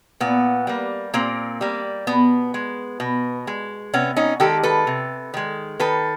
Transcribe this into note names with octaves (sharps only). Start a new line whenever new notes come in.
A#2 B3
G3 A#3
A#2 A#3 C4
G3 A#3
B2 B3
G#3
B2
G#3
C3 B3 C#4
C#4 D#4
D#3 G#3 G4 A4
A4 B4
C3
D#3 G#3
D#3 A4 B4